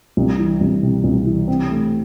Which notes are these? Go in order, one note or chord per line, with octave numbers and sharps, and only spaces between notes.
C2
E3
C2
C3
C2
E3
C4
A3